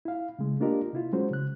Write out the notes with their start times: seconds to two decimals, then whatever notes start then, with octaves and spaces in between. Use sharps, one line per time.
0.05 E4 F5
0.39 C#3 G#3
0.60 A#3 D4 F4 G4 A#4 D#5
0.93 C3 E4 F4
1.13 F#3 G#3 C#4 F#4 C5
1.30 C#3 F#6